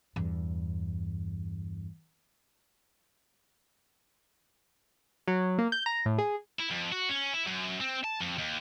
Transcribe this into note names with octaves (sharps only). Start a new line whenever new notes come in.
E2 G2
F#3
A#3
G6
A#5
A2
G#4
E4
F2
F#4
C#4
E4
F#2
C4
A5
F2
D#2